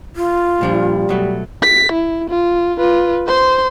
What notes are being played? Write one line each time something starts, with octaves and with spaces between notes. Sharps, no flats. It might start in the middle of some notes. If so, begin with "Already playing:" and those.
F4
A#2 F3 G3 D4
B2 F#3 A3
B6
E4
F4
F4 B4
C5 C6